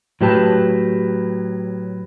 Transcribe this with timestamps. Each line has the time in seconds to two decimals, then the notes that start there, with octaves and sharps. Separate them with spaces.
0.21 A2 F#3 G4 B4 A5